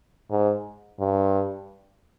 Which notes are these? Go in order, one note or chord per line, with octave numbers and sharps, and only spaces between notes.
G#2
G2